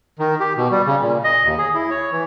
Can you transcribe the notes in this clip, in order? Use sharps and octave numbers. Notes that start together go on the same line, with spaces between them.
D#3
G4
B2
G3
C#3
A#2
D#5
D#2
G#4
E4
C#5
E3